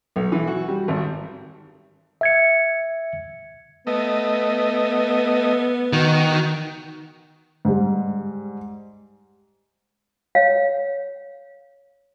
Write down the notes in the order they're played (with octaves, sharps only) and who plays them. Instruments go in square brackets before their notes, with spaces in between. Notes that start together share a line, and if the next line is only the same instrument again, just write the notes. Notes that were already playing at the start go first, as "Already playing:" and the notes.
[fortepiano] B1
E3
F#4
G3
G#1
[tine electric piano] E5 G#6 C#7
[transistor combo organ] A3 D#5 [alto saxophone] B3
[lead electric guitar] D#3 [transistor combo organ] F#4
[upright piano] G#2 G3
[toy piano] C#5 F5